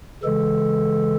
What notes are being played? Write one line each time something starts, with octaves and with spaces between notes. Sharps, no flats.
C#3 E3 G#3 A4